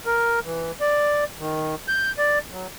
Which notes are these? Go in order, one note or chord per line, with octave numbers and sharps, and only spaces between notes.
A#4
E3
D5
D#3
G6
D5
F#3